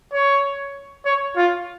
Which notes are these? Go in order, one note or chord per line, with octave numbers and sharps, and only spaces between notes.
C#5
C#5
F4